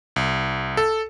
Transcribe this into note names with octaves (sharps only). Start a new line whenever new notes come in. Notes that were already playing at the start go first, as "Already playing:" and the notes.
C2
A4